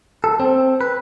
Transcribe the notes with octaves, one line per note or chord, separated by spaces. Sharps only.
A4
C4
B4